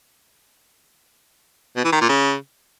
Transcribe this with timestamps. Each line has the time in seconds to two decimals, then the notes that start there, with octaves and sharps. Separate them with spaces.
1.76 B2
1.84 E3
1.93 D#3
2.01 A#2
2.09 C#3